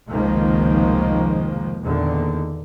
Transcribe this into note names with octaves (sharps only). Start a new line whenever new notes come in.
F1 C#2 D#3 F3 G#3 A#3
E2 A#2 D3 D#3